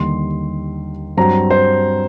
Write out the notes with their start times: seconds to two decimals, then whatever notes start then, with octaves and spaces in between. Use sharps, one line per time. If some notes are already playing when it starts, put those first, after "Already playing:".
Already playing: D#2 D3 G3 C6
1.17 G2 F#3 C4 A#5
1.50 C5